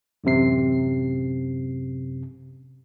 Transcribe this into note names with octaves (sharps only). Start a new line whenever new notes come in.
A1 F#2 C3 C7